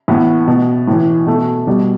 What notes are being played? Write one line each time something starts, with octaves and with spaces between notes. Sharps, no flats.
A2 E3 B3
B2
A2 E3
B2 A3
B2 G3